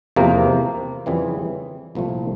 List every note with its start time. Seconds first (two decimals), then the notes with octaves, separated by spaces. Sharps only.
0.16 E2 C3 F3 A#3
1.06 F2 C#3 E3 G3
1.95 C2 A#2 F3 A3